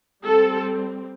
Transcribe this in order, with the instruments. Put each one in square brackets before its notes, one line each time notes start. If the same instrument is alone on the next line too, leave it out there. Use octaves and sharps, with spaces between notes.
[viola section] G3 C4 A4